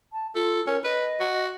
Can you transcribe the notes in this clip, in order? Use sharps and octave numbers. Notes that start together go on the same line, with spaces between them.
A5
F4 A4
C#4 A#4
B4 D#5
F#4